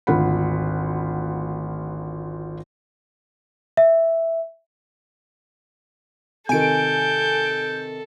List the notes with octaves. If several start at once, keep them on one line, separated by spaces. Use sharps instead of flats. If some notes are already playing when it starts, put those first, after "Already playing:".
G#1 D2 F4 F#5 B5
E5
C3 D#3 A4 G#5 G6 D7